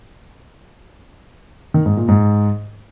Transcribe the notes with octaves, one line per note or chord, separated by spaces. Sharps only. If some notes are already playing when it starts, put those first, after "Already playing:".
D#3
G#2
A#2
G#2